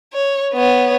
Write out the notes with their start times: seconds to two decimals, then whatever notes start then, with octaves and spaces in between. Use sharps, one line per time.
0.13 C#5
0.54 B3 C#5